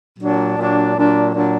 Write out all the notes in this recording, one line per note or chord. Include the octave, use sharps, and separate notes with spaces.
A#2 F#3 D4
A#2 F#3 D4
A#2 F#3 D4
A#2 F#3 D4